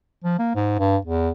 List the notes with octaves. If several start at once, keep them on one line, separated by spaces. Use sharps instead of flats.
F3
A#3
G#2
G2
E2